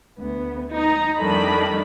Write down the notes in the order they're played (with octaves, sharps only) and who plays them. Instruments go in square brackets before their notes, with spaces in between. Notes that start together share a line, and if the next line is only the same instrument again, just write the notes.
[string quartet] D2 B3
[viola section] D#4 [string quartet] D#5 A#5
[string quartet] F2 A2 G3 [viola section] D#3 D4 B5